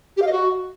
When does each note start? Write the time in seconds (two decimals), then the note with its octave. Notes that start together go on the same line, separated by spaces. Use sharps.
0.17 G4
0.22 F5
0.27 D#5
0.32 F#4